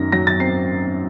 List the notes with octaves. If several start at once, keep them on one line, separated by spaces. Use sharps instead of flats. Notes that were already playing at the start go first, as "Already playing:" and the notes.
Already playing: F#2 D#3 A#6
F#3 A#6
A6
C4 C7